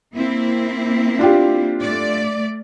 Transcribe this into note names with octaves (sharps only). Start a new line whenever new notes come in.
A#3 C4 E4
D4 F4 G4
A3 D5